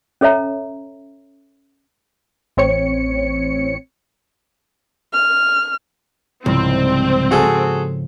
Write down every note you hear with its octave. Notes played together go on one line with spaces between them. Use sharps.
C#4 A4 C#5 E5 A#5
A1 C4 C#5 C#7
F6
C2 G#2 C#3 F3 C4
F#4 G#4 A4